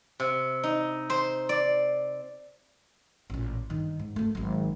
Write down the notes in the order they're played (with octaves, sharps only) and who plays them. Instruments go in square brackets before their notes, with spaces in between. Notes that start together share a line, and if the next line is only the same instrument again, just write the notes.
[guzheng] C3
D#4
C5
D5
[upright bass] A1 A#2
G2 D#3
G#2
G#1 A3
G#1 F#3